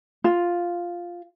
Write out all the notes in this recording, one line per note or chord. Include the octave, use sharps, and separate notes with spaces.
F4